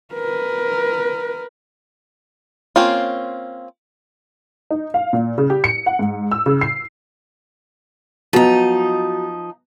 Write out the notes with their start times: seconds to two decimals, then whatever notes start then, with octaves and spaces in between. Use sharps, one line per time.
0.14 A#4 B4
2.76 A#3 C4 C#4 F4
4.71 D#4
4.94 F5
5.13 A#2
5.38 C#3
5.50 G4
5.64 C#7
5.86 F#5
5.99 G#2
6.32 E6
6.46 C#3
6.61 C7
8.33 F3 F#3 B3 D#4